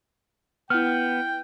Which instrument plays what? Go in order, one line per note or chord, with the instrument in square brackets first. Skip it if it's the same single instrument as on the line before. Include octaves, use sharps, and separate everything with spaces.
[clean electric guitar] B3 [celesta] E4 F6 [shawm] G5